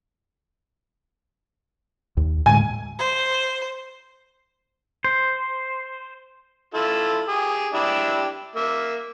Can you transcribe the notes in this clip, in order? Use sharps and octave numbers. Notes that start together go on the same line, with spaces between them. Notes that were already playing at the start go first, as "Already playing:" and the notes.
D#2
A2 D3 G#3 G#5
C5
C5
E4 F4 A4
G4 G#4
D4 E4 G4
A#3 E5